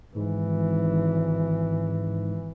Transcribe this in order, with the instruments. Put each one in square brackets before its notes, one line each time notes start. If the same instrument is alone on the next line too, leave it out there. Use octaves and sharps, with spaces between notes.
[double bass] G#1 E3 [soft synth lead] G#2